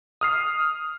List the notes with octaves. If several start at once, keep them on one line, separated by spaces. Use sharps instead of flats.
D#6 F6 C7